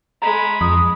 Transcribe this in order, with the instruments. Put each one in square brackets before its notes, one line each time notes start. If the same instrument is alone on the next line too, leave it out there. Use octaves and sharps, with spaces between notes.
[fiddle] G#3 B5 [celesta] A#5
[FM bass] F2 [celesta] D#6